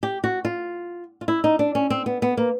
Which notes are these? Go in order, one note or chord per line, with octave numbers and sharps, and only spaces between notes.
G4
F#4
F4
F4
E4
D#4
D4
C#4
C4
B3
B3
A#3